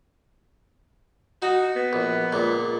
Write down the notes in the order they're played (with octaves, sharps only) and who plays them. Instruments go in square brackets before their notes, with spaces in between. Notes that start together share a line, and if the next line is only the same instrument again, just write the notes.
[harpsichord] D#4 [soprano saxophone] F#4
[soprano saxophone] B3
[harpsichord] A#1
C#2 A#2